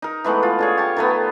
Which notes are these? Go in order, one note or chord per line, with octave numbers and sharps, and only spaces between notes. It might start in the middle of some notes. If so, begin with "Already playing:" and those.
D#4 A#4
E3 G#3 A3 B3
F4
D3 G#4 C#5
G4 A5
D#3 A3 B3